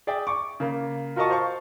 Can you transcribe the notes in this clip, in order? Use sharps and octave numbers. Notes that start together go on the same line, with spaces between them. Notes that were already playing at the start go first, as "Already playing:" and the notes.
G#4 D5 E5 G5
C#6 D6
C#3 A#3
F4 F#4 A#4 D#5 A5 C#6
C5 F5 A5 C#6